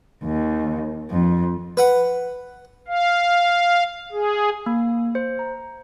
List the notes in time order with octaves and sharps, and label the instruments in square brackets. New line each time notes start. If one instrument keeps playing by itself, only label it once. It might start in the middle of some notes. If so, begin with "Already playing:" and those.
[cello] D#2
F2
[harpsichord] B4 F#5
[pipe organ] F5
G#4
[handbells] A#3
C5
A#5